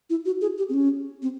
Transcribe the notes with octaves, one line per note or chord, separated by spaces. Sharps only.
E4
F#4
G#4
G4
C4
C#4
C4